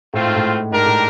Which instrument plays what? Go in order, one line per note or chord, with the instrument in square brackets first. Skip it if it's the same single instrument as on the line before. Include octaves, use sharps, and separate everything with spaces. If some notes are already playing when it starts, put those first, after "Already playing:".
[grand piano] A2 [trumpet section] A3 C4 F4
[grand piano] G#2
A2
[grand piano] G#2 [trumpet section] D4 G4 A#4
[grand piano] A2